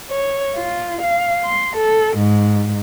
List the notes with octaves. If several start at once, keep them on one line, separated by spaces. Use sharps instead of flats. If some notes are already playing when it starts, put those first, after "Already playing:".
C#5
F4
F5
C6
A4
G#2